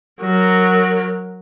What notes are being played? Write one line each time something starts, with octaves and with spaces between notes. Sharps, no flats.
F#3 A#4